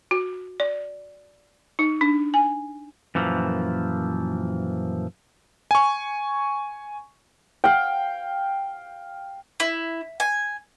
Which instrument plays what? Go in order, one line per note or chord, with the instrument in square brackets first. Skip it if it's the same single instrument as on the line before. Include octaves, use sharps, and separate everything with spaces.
[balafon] F#4
D5
D#4
D4
G#5
[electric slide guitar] F#2 A#2 E3 F3
[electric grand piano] G#5 C#6
[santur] F5 G5
[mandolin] E4
G#5